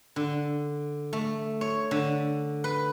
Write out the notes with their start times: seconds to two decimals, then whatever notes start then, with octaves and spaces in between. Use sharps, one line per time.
0.16 D3
1.13 A3
1.61 C#5
1.91 D3
2.64 B4